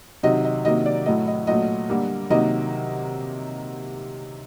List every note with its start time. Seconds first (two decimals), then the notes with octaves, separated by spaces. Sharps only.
0.23 C3 D#3 F#3 D#5
0.44 D#5
0.65 C3 D#3 F#3 A#3 D#5
0.86 D5
1.06 A2 F#3 A3 D#5
1.27 D#5
1.47 A#2 F#3 A3 D#5
1.89 D3 G3 A#3
2.30 C3 D#3 F#3 A#3 D#5